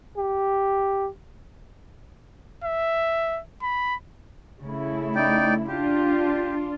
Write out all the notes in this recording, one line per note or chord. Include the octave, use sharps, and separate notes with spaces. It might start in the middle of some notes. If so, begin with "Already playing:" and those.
G4
E5
B5
C#3 A3 E4
D#4 D5 G5
D4 F4 G4